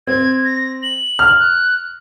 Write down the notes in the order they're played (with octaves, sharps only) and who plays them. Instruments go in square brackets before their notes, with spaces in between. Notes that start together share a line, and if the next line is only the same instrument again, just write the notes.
[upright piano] C4 [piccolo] G#6
[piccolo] A#6
F#7
[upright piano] F6
[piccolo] F#6